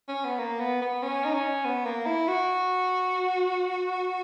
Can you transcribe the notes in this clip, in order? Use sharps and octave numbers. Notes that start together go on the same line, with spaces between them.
C#4
B3
A#3
B3
B3
C#4
D#4
C#4
B3
A#3
E4
F#4